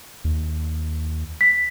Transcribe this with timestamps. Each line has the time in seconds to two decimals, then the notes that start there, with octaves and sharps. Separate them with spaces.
0.25 D#2
1.41 B6